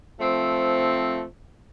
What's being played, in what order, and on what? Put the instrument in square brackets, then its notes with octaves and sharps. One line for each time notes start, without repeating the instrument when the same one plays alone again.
[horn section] F3 A3 C4